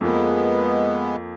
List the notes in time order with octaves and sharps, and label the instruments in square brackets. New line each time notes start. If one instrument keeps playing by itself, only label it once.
[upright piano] F2 F3 A#3 [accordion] G#3 B3